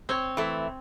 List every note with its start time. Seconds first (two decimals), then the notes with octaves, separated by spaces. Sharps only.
0.09 C4 C#5
0.37 E3 A3